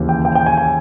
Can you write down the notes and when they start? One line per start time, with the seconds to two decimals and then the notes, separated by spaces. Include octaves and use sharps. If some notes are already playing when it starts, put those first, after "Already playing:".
Already playing: D#2 C#3 E3
0.09 G5
0.25 G5
0.35 G5
0.46 G#5
0.58 G#5